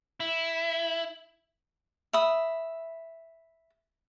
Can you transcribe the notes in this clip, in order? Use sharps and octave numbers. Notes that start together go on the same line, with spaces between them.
E4
E5 B5 D#6